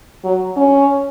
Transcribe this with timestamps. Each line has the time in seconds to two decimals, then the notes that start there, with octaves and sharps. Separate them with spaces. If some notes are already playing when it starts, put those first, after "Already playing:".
0.24 F#3
0.56 C#4